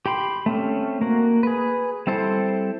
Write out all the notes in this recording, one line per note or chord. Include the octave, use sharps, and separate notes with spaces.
G4 G5 B5 C6
A3 C4 C#4
A#3 F#4
G#4 B4
G3 C4 E4 A4 C5